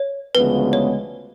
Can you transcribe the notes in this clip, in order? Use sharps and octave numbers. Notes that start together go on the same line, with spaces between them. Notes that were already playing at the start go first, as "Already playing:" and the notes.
Already playing: C#5
D2 C#3 F3 G#3 B3 B4
C#5